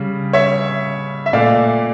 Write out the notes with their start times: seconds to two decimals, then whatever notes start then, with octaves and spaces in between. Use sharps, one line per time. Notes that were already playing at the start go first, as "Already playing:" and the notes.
Already playing: C#3 G3
0.33 C#5 E5
1.26 E5
1.33 A#2 A3 D5 F5